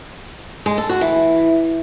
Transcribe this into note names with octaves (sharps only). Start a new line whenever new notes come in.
G#3
A4
F#4
E3